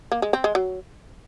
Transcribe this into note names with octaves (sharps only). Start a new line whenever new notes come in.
A#3
G#3
C4
G#3
F#3